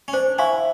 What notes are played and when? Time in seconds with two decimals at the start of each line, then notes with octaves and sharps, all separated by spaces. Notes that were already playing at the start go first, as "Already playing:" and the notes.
0.08 C#4
0.13 D4 C5
0.39 E4 F5 G#5 C#6